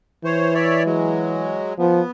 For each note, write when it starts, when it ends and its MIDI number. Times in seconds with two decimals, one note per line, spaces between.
0.25 1.63 52
0.25 0.54 72
0.25 0.54 73
0.54 0.83 73
0.54 0.83 74
0.54 0.83 76
0.85 1.73 54
0.85 1.73 56
1.79 2.01 53
1.79 2.11 59